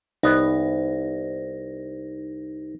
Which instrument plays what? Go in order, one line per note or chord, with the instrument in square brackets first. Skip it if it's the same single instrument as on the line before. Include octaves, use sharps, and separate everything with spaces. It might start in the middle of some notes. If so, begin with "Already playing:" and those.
[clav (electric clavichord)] C2 B3 [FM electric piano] D#4